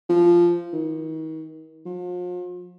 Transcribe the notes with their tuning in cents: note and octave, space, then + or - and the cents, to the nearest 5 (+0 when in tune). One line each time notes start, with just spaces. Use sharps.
F3 -10
D#3 +35
F3 +40